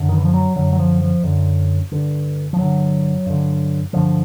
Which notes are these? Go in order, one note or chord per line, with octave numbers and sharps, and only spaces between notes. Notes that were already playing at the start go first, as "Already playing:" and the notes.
Already playing: F#2 D3
D#3
E3
F3
F#3
F#2 D3 F#3
F#3
F3
F3
F#2 D3
G2 D3
F3
G2 D3 F#3
G2 D3
G2 D3 F3